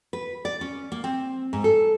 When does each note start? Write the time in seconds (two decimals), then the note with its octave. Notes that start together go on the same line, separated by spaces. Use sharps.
0.13 B4
0.45 D5
0.61 C#4
0.92 A#3
1.04 C4
1.53 G#2
1.64 A4